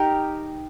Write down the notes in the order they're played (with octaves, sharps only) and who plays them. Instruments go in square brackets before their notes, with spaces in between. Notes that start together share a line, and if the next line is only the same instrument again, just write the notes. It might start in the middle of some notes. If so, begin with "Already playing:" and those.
Already playing: [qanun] D#4 G4 A#4